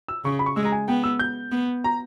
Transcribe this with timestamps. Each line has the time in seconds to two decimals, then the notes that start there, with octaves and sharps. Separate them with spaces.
0.08 E6
0.24 C#3 C#6
0.39 B5
0.46 C#6
0.56 G#3 E6
0.65 A#5
0.72 G#5
0.88 B3 G5
1.04 E6
1.19 G6
1.52 B3
1.84 A#5